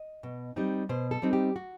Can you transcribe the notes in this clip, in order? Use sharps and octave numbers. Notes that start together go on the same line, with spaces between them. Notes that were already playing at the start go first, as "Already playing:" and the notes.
Already playing: D#5
B2
G3 C4 D#4
B2 C5
A4
G3 C4 D#4
G4
F#4